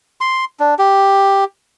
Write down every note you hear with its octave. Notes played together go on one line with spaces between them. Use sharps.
C6
D4
G4